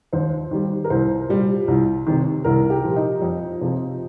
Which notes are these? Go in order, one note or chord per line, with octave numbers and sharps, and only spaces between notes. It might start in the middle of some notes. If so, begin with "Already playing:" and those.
D#2 C5
D#3 G3
A#4
C2 C5
A#2 G3
C2
C3 D#3
C2 A#4
G4
A#2 F3
D#4
F2
C3 F3